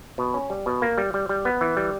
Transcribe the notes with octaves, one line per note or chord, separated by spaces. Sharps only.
B2
C#4
G3
B2
A#3
G3
G3
G3
B3
E3
G3